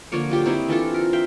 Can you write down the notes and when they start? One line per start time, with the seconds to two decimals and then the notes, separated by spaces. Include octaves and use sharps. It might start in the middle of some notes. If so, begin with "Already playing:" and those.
0.12 D3 F3 A#3 C#5
0.30 F#3 F4 G4 C5
0.46 C4 E4 C#5 D#5
0.68 E3 D4 F4 A4
0.94 A#4
1.13 E5 F5 G5